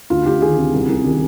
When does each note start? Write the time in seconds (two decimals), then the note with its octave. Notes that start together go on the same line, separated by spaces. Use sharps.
0.10 D2 F4
0.26 D2 G4
0.42 D#3 G#4
0.58 C3
0.73 C2
0.88 C2
1.04 D#3 G4